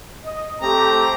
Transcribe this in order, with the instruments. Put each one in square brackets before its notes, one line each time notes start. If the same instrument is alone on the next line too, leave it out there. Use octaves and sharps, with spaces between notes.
[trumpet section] D#5
[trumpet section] A3 C4 G4 [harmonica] A#5